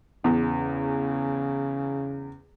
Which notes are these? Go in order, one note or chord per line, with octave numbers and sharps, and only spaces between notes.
E2 C#3